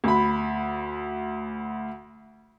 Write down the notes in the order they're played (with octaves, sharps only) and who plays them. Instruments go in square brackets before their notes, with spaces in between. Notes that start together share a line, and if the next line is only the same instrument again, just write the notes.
[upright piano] D2 B5